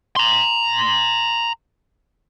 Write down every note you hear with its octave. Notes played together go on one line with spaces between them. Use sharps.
A#5 C6